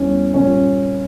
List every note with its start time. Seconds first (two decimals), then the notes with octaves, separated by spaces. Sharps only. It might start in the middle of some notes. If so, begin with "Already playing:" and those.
Already playing: E2 E3 G3 C#4
0.34 A#2 G3 A#3 C#4